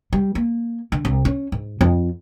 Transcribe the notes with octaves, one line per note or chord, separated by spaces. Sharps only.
G3
A#3
D3
C2
C#4
G#2
F2